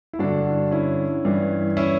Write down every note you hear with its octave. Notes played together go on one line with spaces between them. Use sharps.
E4
G2 D3 D4 F#4
C#4 E4
G2 E3
C#4 E4